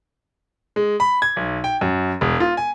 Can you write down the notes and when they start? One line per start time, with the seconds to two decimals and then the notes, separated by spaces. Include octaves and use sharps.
0.76 G#3
1.00 B5
1.22 G#6
1.36 B1
1.64 G5
1.81 F#2
2.21 E1
2.40 F4
2.57 G#5